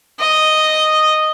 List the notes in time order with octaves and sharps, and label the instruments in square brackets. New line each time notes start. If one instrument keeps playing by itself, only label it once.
[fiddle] D#5